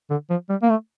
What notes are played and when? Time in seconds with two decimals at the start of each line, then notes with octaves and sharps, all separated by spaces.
0.10 D3
0.30 F3
0.50 G3
0.62 A#3
0.70 A3